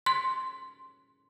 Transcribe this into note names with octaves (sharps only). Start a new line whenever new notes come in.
C6